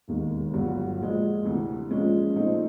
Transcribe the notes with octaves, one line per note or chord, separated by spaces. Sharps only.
E1 D#2 D#3
G1 G2 D3 F#3
A#2 F3 G#3
D2 C3 E3
A#2 F3 G#3 C#4
A#2 F3 A3 C4 D#4